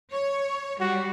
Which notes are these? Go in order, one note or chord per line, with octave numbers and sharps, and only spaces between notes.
C#5
G3 F#4